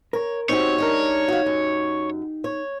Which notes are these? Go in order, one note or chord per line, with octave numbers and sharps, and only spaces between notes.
A#4 C#5
C4 C#4 D#4 F#4 G4 C#5
G#3 D4 A#4
F#4 F5
F#2
C#5